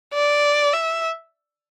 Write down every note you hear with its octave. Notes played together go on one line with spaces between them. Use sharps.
D5
E5